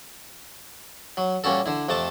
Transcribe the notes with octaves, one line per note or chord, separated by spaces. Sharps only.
F#3
A#2 G3 C#4 F#4 A4
D3 E4
F2 C3 A3 A5 D6